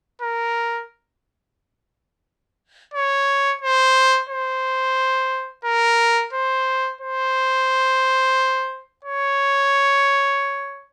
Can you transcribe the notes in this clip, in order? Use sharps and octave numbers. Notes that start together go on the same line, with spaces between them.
A#4
C#5
C5
C5
A#4
C5
C5
C#5